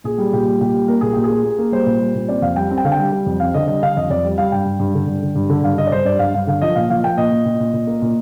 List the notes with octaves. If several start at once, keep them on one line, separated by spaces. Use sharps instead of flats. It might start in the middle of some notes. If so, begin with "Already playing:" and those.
A#2 G#4
G3
A#2 G4
G3
A#2 G4
G3
A#3 A#4
A#2 G#4
A#2 G4
G#4
A#3
A#3
A#3
G3 C5
A#2
G3
A#2
C4 D5
F2 F5
G3 G5
C4
G5
D3 F5
G5
G3
G3
F2
C4 F5
D3 D#5
G3 D#5
D3 F5
F2 D#5
F2 D5
G3
G3 F5
G2 G5
G2
G2
D3
G2
D3
G2
D3
G2 F5
D3 D#5
D5
G2 C5
G2 D5
G2 F5
G2 F5
D3 F5
F3 D#5
A#2 F5
F3 F5
A#3 G5
A#2 D#5
A#2
A#2
A#2
A#2
A#3
A#2